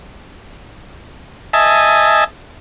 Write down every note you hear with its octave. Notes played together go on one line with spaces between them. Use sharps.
D#5 E5 G#5 A5